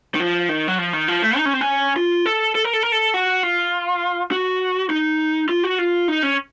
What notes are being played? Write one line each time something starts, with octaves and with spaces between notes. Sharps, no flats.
D#3
F3
D#3
F#3
F3
D#3
F3
A3
D#4
C#4
C4
C#4
F4
A4
A4
A#4
A4
A#4
A4
F#4
F4
F#4
D#4
F4
F#4
F4
D#4
C#4